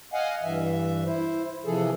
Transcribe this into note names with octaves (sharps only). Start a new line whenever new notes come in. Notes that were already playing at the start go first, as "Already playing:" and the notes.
D#5 F5 F#5 G#5
G2 E3 E5
E4 C5
C3 E3 F3 G#4 A4